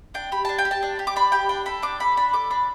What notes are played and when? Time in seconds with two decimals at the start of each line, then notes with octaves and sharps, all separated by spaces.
0.14 D4 G5
0.32 G4 B5
0.45 D4 A5
0.58 G5
0.65 G4
0.71 A5
0.83 D4
0.99 G4
1.07 D6
1.16 D4 B5
1.32 G4 G5
1.49 D4 G5
1.66 A4 B5
1.82 D4 D6
2.00 A4 B5
2.17 D4 B5
2.33 A4 D6
2.50 D4 B5